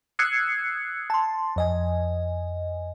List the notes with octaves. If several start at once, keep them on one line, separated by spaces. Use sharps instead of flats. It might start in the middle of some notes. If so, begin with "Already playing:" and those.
D#6 E6 F#6 G#6 C7 C#7
A5 C6
F2 D#5 G#5